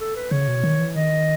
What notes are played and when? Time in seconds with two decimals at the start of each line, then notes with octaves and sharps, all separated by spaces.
0.01 A4
0.16 B4
0.31 C#3 C#5
0.48 B2
0.64 D#3
0.79 E3
0.96 D#3 D#5